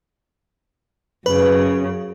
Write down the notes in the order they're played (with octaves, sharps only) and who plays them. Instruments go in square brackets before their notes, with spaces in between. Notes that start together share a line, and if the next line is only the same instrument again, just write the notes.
[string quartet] F#2 C#3 [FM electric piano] B4